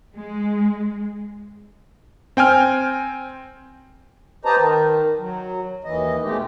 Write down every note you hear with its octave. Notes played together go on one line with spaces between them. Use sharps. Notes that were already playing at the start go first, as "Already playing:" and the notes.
G#3
C4 G5 G#5 F6
G4 B4 C5 D#5 A5 A#5
D#3
F#3
D#2 E3 D#5
B2 G#3 A3 G4